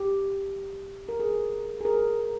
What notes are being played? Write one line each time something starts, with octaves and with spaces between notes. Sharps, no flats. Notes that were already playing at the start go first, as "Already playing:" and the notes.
Already playing: G4
A#4
G#4
G#4
A#4